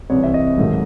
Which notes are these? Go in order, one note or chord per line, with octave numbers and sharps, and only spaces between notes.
C2 C3 E3 C#5
E5
D#5
G#2 D#3 F#3 A3